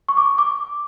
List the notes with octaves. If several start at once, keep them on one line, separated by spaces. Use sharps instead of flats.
C#6
D6
D6